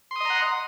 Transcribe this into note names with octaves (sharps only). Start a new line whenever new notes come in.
D#5 F#5 A#5 C6 D#6